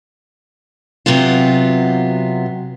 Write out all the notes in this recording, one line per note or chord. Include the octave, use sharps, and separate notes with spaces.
C3 F#3 B3 F4